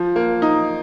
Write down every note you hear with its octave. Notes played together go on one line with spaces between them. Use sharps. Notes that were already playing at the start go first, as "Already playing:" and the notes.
Already playing: F3
A#3
D#4